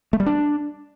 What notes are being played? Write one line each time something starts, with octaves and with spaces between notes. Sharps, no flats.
A3
G3
D4